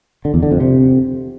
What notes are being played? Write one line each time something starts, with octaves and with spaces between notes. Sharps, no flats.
D3
E2
D3
F2
C3